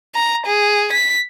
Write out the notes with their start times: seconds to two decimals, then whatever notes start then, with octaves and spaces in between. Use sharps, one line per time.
0.15 A#5
0.46 G#4
0.92 B6